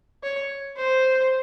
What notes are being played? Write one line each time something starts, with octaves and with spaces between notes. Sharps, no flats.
C#5
C5